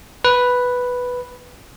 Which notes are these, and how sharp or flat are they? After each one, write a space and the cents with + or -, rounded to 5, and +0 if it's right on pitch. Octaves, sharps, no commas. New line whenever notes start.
B4 +0